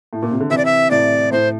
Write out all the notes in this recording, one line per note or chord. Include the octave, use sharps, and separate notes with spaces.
A2
A#2
C3
D3
C3 E3 E5
D5
E5
A2 C3 D5
A2 C5